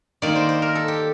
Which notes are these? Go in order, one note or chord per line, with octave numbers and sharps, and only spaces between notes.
D#3 A#3 D#4 D5
C5
C5
A#4
A4
G4